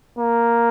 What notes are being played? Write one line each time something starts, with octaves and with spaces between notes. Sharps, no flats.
A#3